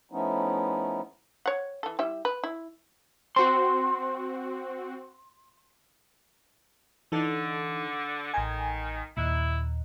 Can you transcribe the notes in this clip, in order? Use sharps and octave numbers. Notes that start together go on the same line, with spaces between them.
F3 A3 B3 C#4 D#4 E4
C#5 F#5
E3 A4
G3 E4 E5
B4
E4
C4 F#4 C6
D3 E3 D#4 A4
A1 D#3 G#5
D#2 A#2 E4